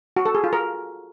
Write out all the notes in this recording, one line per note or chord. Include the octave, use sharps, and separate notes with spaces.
F#4
A4
G#4
F4
A#4